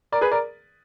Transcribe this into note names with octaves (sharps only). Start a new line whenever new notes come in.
A#4 D5
G#4 B4
A#4 D5